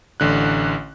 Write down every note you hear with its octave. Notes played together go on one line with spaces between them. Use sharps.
A1 D3 F#6